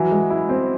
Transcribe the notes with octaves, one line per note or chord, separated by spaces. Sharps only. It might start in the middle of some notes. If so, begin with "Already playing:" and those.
Already playing: E3 F#3
G#3
E4
C4